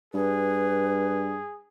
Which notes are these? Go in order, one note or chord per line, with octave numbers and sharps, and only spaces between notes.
G2 G#4 B4